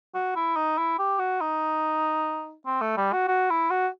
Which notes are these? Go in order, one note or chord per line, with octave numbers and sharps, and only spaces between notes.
F#4
E4
D#4
E4
G4
F#4
D#4
C4
A3
G3
F#4
F#4
E4
F#4